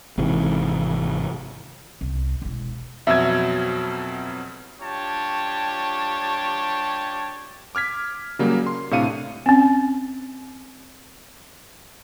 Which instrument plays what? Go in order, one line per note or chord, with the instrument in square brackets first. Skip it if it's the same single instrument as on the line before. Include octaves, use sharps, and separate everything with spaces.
[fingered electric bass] G#1 G#2 C3 E3
[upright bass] C2
E1 E4
[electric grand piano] F2 B2 F#3 [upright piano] E5 G#6
[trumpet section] G3 D4 F4 G4 C#5 A5
[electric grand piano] D6 F6 G#6 B6
C#3 F#3 G3 A#3
C6
A2 C3 D4 F5 C#7 D#7
[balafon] C4 C#4